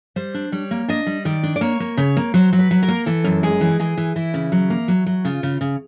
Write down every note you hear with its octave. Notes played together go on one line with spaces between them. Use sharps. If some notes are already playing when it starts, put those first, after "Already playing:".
G3 C5
D4
G3 C#5
A#3
D4 D#5
G3
D#3 D5
D4
D5
A#3 C#5
A#3
C#3 C#5
A#3
F#3 C5
F#3
B4
F#3
A#4
A#3
E3 A4
F#2
G#3 G#4
E3
E3 G#4
E3
E3 E4
C#3
F#3
A#3
F#3
F#3
C#3 F4
C#3
C#3